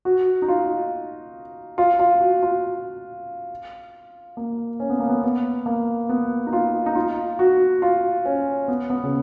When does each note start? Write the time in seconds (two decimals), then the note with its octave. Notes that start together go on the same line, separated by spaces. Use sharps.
0.05 F#4
0.42 D#4
0.48 F4
1.78 F4
1.99 F4
2.21 F#4
2.42 F4
4.37 A#3
4.80 C#4
4.90 B3
5.00 A#3
5.09 B3
5.23 B3
5.66 A#3
6.09 B3
6.47 D#4
6.53 F4
6.86 D#4
6.95 F4
7.39 F#4
7.82 F4
8.25 C#4
8.68 B3
8.90 B3
9.03 C#3